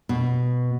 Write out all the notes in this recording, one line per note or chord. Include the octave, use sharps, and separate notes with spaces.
B2